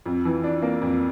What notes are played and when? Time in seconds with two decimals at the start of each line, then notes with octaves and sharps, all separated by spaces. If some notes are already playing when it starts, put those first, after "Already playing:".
0.06 F2
0.25 E3
0.44 D4
0.62 A#3
0.82 F2